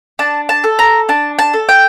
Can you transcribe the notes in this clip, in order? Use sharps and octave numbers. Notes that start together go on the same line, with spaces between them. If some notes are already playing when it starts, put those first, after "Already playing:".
D4 A5
A5
A4
A#5
D4 A5
A5
A4
G5